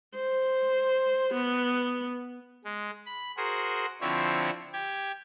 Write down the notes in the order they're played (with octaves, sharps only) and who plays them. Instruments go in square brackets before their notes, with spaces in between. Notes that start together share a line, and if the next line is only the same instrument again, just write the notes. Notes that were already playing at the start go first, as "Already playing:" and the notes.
[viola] C5
B3
[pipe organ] G#3
B5
F#4 G#4 A#4 C5
D3 F3 C4 E4 C#5
G4 G#6